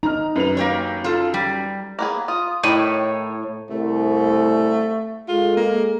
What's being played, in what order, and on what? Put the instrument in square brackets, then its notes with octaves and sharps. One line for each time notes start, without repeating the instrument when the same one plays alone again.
[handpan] D#4 [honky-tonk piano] A#5 F6
[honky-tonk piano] F#2 B4 F7
[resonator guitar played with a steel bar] A#3 G4 C#5
F4 A4
G3
[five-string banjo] A#3 B3 G#4
[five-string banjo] F4 [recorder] D#6
[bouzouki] A2 [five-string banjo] D#3 G4 [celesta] E4 D#7 [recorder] C#5
[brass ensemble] C2 [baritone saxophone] A3
[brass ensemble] G#3 G#4 A4 [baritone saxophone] F4
[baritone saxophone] A#3